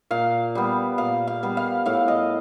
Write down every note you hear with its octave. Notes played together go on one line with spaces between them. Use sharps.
A#2 F5
G3 B3
A#2 F5
F5
G3 B3
F5
A2 F5
D#5